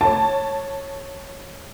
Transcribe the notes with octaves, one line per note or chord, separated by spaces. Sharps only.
C#5 A5